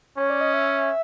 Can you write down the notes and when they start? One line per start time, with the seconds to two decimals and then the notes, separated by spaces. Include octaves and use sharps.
0.17 C#4 C#5
0.30 D5
0.41 D#5
0.54 E5